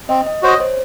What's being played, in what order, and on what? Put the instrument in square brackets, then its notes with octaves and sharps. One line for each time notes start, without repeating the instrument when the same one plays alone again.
[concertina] C4 [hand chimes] D#5
[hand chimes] D#5
[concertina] F#4 C5 D#5 [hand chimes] C#5
[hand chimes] C5